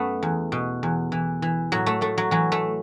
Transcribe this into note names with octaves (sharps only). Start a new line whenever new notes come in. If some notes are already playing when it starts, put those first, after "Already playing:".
Already playing: F#2 A3 B3
E2
B2
E2
E3
E3
A2 F#3
A3
A2 A3
F#3
E3 F#3
A3